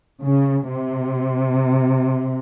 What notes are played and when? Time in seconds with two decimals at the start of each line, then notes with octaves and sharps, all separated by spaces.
0.23 C#3
0.71 C3